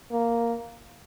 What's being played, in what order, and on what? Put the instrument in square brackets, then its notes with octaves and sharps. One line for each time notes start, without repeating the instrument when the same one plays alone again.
[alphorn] A#3